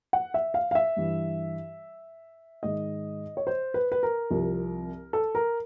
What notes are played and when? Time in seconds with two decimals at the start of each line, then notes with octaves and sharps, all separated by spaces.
0.13 F#5
0.34 E5
0.54 F5
0.71 F5
0.75 E5
0.97 G2 E3
2.63 G#2 D#3 D#5
3.37 C#5
3.47 C5
3.74 B4
3.92 B4
4.03 A#4
4.30 C2 C3 F3
5.13 A4
5.35 A#4